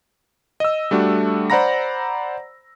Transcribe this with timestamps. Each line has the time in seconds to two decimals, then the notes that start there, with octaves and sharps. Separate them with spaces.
0.60 D#5 E6
0.91 G3 A3 D4 F#4
1.50 C5 D5 F#5 A#5 B5 A#6